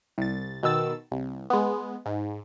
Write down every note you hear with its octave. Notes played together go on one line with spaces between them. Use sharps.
C2 A6
B2 D#3 E6 A6
C2
G#3 B3
G#2